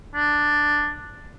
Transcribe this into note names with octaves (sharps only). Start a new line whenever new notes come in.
D4